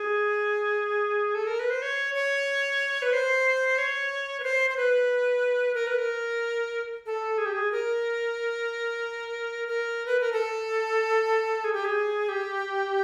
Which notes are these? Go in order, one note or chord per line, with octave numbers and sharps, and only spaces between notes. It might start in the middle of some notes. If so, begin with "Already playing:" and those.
Already playing: G#4
A4
A#4
B4
C5
C#5
C#5
B4
C5
C#5
B4
C5
C5
B4
A#4
B4
A#4
A4
G#4
G4
G#4
A#4
A#4
B4
A#4
A4
G#4
G4
G#4
G4